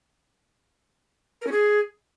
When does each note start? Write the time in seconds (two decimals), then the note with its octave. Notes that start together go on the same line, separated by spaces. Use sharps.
1.42 A#4
1.47 C#4
1.52 G#4